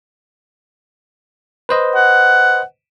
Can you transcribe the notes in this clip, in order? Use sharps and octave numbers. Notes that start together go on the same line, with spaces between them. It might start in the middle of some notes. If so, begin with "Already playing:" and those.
B4 C5 D#5
F#5